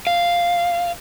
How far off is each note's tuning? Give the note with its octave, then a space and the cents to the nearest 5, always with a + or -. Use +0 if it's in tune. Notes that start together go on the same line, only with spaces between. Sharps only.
F5 -5